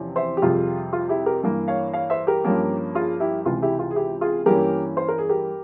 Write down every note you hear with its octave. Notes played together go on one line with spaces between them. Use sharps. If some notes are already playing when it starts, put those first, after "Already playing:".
Already playing: E2 C3 F3 C#4
C5 E5
G4
F2 C3 G3 F4 G#4
F4
E4 G4
G4 A#4
G2 E3 A#3
C#5 F5
C#5 F5
C5 E5
G4 A#4
G2 F3 A#3 C#4
F4 G#4
E4 G4
C#2 C3 E3 F4
E4 G4
F4
G#4
E4 G4
F4 G#4
G2 E3 A#3 C#4 G4 A#4
C5
A#4
G#4
G4 A#4